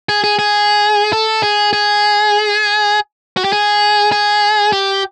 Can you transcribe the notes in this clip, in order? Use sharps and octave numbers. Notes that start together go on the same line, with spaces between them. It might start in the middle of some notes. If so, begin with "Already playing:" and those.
G#4
G#4
G#4
A4
G#4
G#4
F#4
G4
G#4
G#4
G4